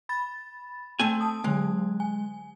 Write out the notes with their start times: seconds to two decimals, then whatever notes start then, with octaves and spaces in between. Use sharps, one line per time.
0.09 B5 A6
1.00 A3 C4 G#5
1.20 A5 D#6
1.44 D3 F#3 G#3
2.00 G#5